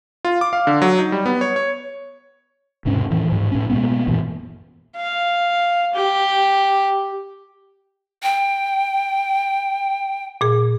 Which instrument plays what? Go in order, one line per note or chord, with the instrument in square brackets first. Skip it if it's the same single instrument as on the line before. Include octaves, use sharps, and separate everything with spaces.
[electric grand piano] F4
D6
F5
D3
F#3
D#4
G3
B3
C#5
C#5
[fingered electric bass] E1 G#2 C3 C#4
A2 E3 F3
G#2 F3
A2 C#4
B2 G#3 A#3 B3
F#2 A#2 E3
[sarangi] F5
G4
[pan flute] G5
[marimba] A#2 G#4